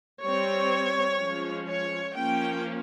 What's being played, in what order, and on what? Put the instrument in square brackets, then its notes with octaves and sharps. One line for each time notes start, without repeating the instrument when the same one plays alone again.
[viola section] G3 C4 C#5
F3 G#3 C#4
C#5
F3 A#3 C#4 G5